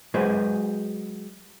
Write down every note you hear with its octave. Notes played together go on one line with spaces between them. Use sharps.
F#3 G#3 F#4 G#4 B4 C5